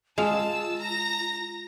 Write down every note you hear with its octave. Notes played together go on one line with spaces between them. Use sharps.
G#3 F4 F5 A5 E6
A#5 A#6